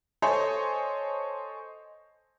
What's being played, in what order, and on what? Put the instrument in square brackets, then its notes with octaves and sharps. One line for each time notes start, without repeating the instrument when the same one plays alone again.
[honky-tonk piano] A4 C5 C#5 D#5 G#5